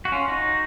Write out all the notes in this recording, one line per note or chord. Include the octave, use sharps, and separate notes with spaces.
F#4
C#4 F4
D#4 F#4